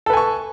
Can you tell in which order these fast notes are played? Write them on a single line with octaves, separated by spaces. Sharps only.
A4 B4 G#5 C#6